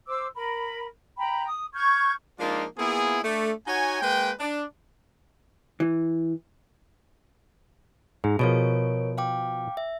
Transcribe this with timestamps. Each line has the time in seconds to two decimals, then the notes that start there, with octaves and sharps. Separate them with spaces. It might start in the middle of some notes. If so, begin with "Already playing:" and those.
0.07 C5 D6 E6
0.35 A#4 B5
1.17 G5 A#5 B5
1.46 D#6
1.74 C#6 F6 G6 G#6
2.40 F3 G#3 A#3 D4 D#4 F4
2.78 A#3 B3 E4 F4 G#4
3.23 A3 D4
3.67 D#4 F#4 C#5 F#5 G#5
4.01 G#3 A#3 B4 G5
4.40 D4
5.80 E3
8.24 G#2 G#4
8.39 B2 F3 A#4 C#5 D7
9.18 F5 G5 D6
9.77 E5